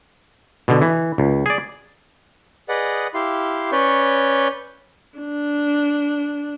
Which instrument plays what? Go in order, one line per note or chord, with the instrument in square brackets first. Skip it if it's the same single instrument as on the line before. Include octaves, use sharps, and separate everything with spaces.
[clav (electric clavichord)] B2 D3
E3
C#2
G#4 D5
[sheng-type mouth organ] G#4 B4 D5 D#5 F#5
E4 G4 F5 C6
C#4 B4 C#5 D5 C#6 G6
[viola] D4